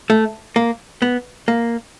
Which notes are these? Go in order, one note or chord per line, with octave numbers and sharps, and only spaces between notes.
A3
A#3
B3
A#3